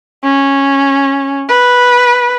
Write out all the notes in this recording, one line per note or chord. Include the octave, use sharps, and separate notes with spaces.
C#4
B4